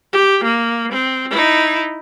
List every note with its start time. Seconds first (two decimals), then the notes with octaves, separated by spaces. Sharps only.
0.13 G4
0.44 A#3
0.92 C4
1.30 D#4 E4